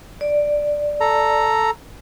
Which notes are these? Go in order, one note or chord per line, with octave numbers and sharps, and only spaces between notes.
D5
A4 A#5